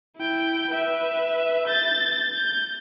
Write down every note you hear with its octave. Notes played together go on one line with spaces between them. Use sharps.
E4 G5
B4 E5
G6 A6
G6